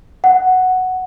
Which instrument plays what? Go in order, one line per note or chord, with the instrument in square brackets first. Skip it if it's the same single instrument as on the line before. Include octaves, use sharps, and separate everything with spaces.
[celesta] F#5